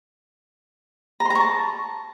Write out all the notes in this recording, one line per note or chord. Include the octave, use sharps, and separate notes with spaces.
A#5
C6
A#5
C#6
A5